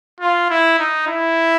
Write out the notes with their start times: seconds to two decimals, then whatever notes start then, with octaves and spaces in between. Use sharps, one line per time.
0.20 F4
0.50 E4
0.79 D#4
1.08 E4